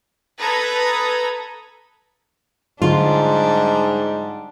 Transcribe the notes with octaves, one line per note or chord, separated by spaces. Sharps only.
A4 B4 A#5 B5 D#6 G#6
G#2 D3 F#3 G3 D4 F4